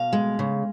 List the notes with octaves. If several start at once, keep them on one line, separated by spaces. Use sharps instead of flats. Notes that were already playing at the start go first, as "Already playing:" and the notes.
Already playing: B2 F5
G#3
C#3